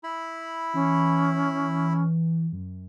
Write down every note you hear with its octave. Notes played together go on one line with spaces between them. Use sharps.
E4 B5
E3 C#4
F#2